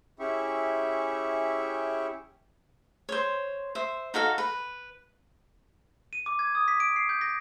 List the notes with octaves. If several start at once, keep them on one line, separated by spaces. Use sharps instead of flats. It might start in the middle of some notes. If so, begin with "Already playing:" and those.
C#4 E4 G4 G#4 E5 C#6
C5 C#5
C5 E5
D#4 F#4 A4 F5
B4
D#7
D6
G#6
D#6
B6
D7
C7
G6
A#6